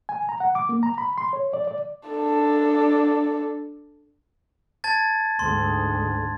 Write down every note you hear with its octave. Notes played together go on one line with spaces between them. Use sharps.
G#5
A#5
F#5
D6
A#3
A#5
B5
C6
C#5
D5
D5
D4 A4
A5 G#6 A6
D2 G#2 C6